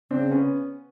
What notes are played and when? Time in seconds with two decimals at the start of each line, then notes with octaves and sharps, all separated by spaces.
0.11 C#3 C4 D4
0.31 B3 C#4